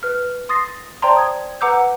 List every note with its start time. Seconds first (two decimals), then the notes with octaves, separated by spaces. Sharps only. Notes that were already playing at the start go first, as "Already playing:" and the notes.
0.03 B4 F6
0.49 C6 D#6 A6 A#6 C7
1.02 C5 D5 G5 A5 A#5 C6
1.16 D#6 G#6
1.61 B4 F#5 A#5 D6 E6 G6